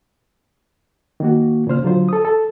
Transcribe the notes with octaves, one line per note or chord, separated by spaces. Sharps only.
D#3 A#3 F#4
A#2 C#3 C5 F6
D3 F#3 F4 C5
A4 D#6
A4